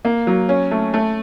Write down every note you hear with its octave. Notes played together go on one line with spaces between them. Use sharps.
A#3
F#3
C#4
A3
A3